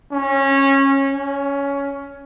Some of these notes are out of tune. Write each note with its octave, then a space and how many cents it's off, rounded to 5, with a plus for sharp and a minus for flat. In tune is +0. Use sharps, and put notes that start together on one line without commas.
C#4 -20
C#4 +15